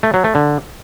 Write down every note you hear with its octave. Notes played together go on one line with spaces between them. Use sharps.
A3
F#3
A3
D3